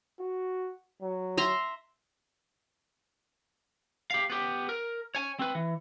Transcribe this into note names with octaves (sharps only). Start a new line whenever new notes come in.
F#4
F#3
E5 A#5 C6
G4 F5
B3 G4
A#4
C#5 G#5
C4 B4
E3